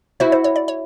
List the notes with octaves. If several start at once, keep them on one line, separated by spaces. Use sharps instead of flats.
E4 F#4 C5
C5
C#5
D5
C#5